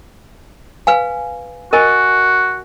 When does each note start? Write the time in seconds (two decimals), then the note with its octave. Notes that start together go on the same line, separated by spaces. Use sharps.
0.87 B4 F5 G#5
1.73 F#4 A#4 D#5 G#5